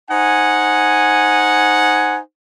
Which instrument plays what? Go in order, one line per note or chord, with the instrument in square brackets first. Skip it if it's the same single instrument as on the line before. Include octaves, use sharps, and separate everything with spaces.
[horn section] D#4 C5 F#5 G#5